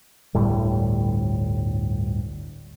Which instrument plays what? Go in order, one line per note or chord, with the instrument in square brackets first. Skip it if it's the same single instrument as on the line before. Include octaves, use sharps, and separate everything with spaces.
[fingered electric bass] G1 D2 A2 G3